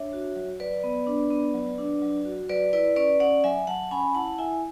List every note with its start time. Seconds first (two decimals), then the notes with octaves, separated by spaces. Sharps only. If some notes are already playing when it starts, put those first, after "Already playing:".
Already playing: D4 C#5 E5
0.13 F#4
0.36 F#3
0.60 F#3 B4 D5
0.84 B3
1.07 D4
1.31 B3
1.54 F#3
1.78 D4
2.02 F#3
2.25 F#4
2.49 F#3 B4 D5
2.73 E4 B4 D5
2.96 C#4 B4 D5
3.20 C#4 D5 F#5
3.44 F#3 E5 G#5
3.67 F#3 F#5 A5
3.91 C#4 G#5 B5
4.15 E4 F#5 A5
4.38 E4 E5 G#5